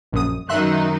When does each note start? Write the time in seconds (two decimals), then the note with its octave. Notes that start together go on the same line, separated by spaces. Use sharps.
0.12 A#1 F#2 D#6
0.49 F#2 D#3 F#3 D#4 E5 C6 F#6